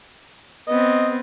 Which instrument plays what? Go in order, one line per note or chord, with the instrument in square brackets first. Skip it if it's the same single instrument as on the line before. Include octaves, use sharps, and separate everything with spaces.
[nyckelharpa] B3 C4 [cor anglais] D#5